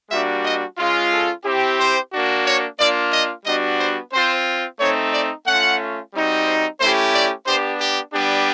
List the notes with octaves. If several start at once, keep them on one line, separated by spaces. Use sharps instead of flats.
G3 A#3 D4 F#4 E5
D#5
G#3 C#4 F4
A4
C4 E4 G4
C5
A#3 D4 F#4
C#5
A#3 D4 F4 D5
D#5
G3 B3 D4 F#4 D#5
C5
C4 F4 C5
A3 C4 D#4 C#5
D5
A3 C#4 F4 F#5
G3 C4 D#4 F#4
C5
A3 C#4 E4 G4 C5
D5
B3 D4 G4 C5
G4
G3 B3 D4 G4